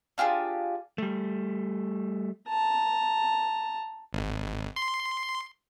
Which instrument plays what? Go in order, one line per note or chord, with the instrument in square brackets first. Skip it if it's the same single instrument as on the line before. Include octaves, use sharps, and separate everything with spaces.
[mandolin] D4 F4 G4 G#4
[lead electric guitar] G3 A3
[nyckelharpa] A5 A#5
[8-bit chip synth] G#1
C6